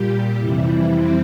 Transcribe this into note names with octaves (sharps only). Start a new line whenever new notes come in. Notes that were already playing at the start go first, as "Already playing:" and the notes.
Already playing: A#2 G3 G4
F2 C3 E3 G3 E4
C4